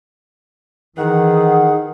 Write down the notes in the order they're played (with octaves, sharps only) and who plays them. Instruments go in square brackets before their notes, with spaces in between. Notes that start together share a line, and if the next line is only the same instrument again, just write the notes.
[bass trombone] D#3 [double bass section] E3 [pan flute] G#4 [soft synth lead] F#5